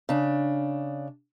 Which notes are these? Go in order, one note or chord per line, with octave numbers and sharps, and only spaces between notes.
C#3 D4